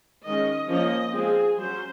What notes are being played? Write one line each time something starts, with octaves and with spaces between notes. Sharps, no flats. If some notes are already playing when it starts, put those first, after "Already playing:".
D#3 G#3 C#4 D#5
F3 A#3 C#4 D#5
F3 G#3 C4 G#4
F#3 C#4 C5